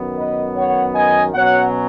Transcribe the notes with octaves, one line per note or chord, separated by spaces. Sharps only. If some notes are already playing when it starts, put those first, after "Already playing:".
Already playing: F#2 D#3 B3
B4 D#5
C#5 F#5
D#5 G#5
B2 F#3 C#4 C#5 F#5